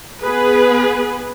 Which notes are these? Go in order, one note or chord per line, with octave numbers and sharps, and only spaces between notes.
B3 G#4 B4